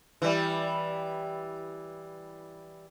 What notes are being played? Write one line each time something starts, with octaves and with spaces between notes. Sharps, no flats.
E3 G3